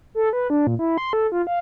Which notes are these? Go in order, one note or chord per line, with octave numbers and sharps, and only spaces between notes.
A4
B4
D4
A#2
E4
C6
A4
F4
F5